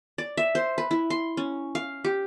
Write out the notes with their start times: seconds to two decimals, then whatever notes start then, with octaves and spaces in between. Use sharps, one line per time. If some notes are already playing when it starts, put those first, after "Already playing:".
0.18 D5
0.37 E5
0.55 C5
0.78 B4
0.91 E4
1.10 C6
1.37 C#4
1.75 F5
2.04 G4